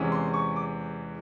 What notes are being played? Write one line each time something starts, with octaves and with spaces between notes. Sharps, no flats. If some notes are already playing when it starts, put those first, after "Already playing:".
Already playing: E2 C3 E3 G#3 C#4
C6
C#6
D6